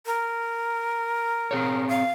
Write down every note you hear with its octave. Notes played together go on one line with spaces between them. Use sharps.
A#4
C4 G#4 C#5
F5